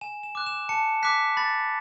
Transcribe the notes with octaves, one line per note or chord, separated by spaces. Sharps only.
G#5 E7
E7
D6 F#6
E7
A5 C#7
D6 F#6 B6
B5 A6